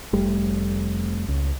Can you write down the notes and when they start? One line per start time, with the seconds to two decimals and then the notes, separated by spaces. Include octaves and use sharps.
0.13 F1 G3 A3
1.28 C#2